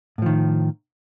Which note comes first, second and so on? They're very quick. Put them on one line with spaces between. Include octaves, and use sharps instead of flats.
A2 F3 D#3